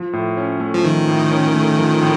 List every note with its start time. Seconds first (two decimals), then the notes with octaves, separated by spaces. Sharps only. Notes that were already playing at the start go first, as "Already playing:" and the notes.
Already playing: F3
0.13 A2
0.37 C#4
0.60 A3
0.74 F3
0.84 D#3 F3
1.08 A2
1.31 C#4
1.55 A3
1.79 F3
2.01 A2